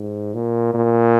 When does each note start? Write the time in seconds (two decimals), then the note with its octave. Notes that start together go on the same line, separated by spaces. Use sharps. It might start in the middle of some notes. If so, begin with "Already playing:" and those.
Already playing: G#2
0.34 A#2
0.75 A#2